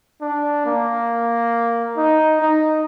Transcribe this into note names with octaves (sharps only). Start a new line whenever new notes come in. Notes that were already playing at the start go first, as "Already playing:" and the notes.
D4
A#3
D#4
D#4